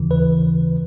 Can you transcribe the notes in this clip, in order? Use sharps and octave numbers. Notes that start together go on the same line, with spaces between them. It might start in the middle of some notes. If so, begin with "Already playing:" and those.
Already playing: D#2 C#3 E3
B4